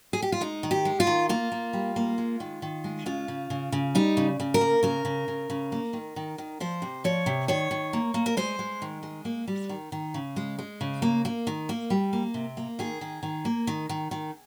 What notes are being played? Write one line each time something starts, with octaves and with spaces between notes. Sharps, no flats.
G#4
G4
F4
G#3 D#4
D#3
G4
G#3
F4
D#3
A#3 F4
A#3
G3
A#3
G#3
D#3
D#3
G#3
C#3 F4
C#3
C#3
C#3
G3 D#4
C#3
C#3
A#4
A#3
C#3 A#4
C#3
C#3
C#3
A#3
D#3
D#3
D#3
F3 C5
C3
F3 C#5
C3
D#3 C#5
D#3
A#3
A#3
A#4
G#3 C5
G#3
D#3
G#3
A#3
G3
D#3
D#3
C#3
G#3
G#3
C#3
A#3
A#3
D#3
A#3
G3
A#3
C3
A#3
D#3 G#4
D#3
D#3
A#3
D#3
D#3
D#3